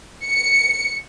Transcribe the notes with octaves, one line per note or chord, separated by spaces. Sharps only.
C#7